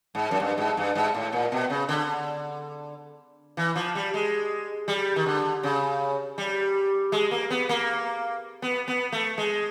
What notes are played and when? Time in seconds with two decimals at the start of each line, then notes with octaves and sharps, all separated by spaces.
0.15 G#2
0.31 F#2
0.40 G2
0.58 G#2
0.77 G2
0.95 G#2
1.14 A2
1.32 A#2
1.52 B2
1.70 C#3
1.89 D3
3.57 E3
3.76 F3
3.95 G3
4.14 G#3
4.88 G3
5.16 D#3
5.26 D3
5.63 C#3
6.38 G3
7.12 G#3
7.31 A#3
7.50 B3
7.69 A#3
8.62 B3
8.88 B3
9.12 A3
9.38 G#3